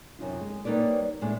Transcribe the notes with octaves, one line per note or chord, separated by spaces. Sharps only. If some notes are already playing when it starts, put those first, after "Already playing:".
F#2 C3 D#4 F4
G#3
G3 A#3 D#4 B4 C#5 D5
A2 G#3 B3 D4